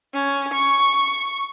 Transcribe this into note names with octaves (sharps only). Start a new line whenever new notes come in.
C#4
C#6